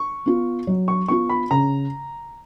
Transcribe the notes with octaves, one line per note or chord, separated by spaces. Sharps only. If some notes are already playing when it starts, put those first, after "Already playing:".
Already playing: C#6
B3 F4
F#3
C#6
B3 F4 C#6
B5
C#3 A#5